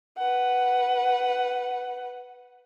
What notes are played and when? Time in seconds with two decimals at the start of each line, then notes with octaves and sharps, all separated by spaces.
0.18 B4 F#5